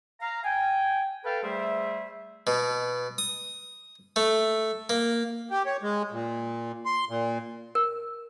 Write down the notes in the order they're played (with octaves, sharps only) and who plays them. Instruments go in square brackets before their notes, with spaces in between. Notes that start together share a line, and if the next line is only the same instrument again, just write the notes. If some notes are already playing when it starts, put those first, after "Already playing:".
[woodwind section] F5 A#5
G5 G#5
A4 B4 F5 G5 A5 B5
G3 A3 G#4 C5 E5
[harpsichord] B2
D#6
A3
A#3
[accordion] G4
C#5
G#3
A#2
C6
A#2
[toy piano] A#4